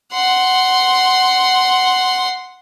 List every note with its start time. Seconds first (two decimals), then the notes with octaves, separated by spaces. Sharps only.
0.13 F#5 C6